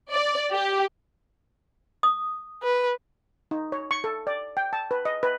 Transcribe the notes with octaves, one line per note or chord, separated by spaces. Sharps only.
D5
G4
D#6
B4
D#4
C#5
C#6
A4
D5
G5
A5
B4
D#5
B4